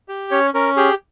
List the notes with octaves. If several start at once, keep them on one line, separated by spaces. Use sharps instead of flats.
G4
C#4 C#5
C#4 A#4
G4 G#4